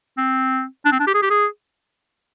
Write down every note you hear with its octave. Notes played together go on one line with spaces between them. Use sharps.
C4
D4
C4
D4
G4
G#4
G4
G#4